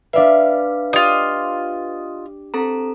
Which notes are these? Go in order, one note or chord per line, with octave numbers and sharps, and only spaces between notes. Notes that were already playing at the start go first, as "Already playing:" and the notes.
D4 B4 D5 E5 F5
F4 G4 D5 D#5
C4 A4 A#5